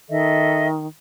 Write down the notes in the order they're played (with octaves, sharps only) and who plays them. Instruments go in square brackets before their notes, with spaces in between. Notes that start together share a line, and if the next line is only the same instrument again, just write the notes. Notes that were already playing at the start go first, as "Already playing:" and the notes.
[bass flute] D#3 [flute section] A4 D#5 E5